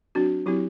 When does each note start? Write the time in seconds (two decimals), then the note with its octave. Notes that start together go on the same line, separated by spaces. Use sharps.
0.15 F#3 C4 D4 F#4
0.46 F#3 C4 E4 G4